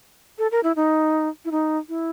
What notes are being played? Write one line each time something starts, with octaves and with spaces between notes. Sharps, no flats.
A4
A#4
E4
D#4
E4
D#4
E4